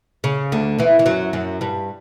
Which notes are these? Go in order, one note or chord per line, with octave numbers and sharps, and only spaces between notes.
C#3
D2 D3
E2 E3
E3
F#2 F#3
F#2 F#3
G2 G3